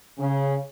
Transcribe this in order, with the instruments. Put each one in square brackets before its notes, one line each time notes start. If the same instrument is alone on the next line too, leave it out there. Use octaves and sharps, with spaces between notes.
[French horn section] C#3